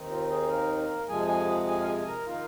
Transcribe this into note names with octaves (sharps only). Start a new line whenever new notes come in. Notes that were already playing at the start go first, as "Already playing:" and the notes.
Already playing: D#2 D#3 C4 D#4
F4
G#4
A#3 A#4
F2 C3 F3 G#3 G#4 G#5
G#4 G#5
G#4
G#4 G#5
F5
G#4 G#5
A#4 A#5
D#3 A#3 D#4 F4 F5